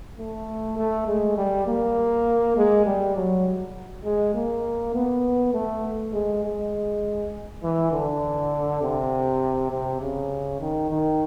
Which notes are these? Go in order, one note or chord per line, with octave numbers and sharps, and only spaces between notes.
A3
A3
G#3
G3
A#3
G#3
G3
F#3
G#3
A#3
B3
A3
G#3
G#3
E3
D3
C3
C3
C#3
D#3
D#3